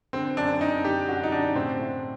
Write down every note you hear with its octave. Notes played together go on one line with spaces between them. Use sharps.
D3 C4
F#2 D4
D3 D#4
F#2 G4
F#2 F#4
D#4
D3 D4
A2 C4
A2